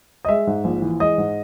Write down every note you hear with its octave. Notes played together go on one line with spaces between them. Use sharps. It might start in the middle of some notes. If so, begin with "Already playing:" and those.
D#5
G#3 E5
G#2
A#1
E3
G#3 D#5
G#2